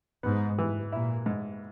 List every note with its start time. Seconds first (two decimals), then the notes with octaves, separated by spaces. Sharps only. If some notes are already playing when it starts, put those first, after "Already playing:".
0.23 G#2 B3
0.59 E3
0.92 A#2 E4
1.26 G#2